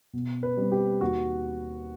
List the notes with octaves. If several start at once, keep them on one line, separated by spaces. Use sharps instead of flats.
B2
B4
G3 C4
G4
D#2 F#4